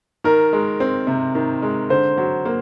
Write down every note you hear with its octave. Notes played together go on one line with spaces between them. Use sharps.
D#3 A#4
G#3
C4
C3
D#3
G#3
D3 C5
F#3
A#3